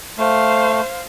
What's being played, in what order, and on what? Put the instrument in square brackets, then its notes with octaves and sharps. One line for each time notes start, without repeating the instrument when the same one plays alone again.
[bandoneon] A3 [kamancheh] C5 F5